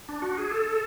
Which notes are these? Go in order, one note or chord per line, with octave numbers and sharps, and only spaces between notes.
D4
F#4
G#4
A4